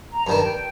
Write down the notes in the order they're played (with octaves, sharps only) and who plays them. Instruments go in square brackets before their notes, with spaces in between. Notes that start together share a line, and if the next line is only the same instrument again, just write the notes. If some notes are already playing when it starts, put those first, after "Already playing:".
[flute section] A#5
[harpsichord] G2 D#3 [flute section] A5
[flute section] G5